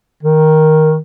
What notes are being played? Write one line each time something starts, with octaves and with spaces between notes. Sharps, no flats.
D#3